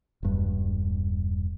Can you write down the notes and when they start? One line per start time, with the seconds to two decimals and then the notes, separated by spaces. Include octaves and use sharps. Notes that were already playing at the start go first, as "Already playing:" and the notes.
0.23 E1 G2